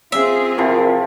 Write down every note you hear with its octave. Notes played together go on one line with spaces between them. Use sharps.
C4 F4 G#4 E5
C3 E3 F3 A#4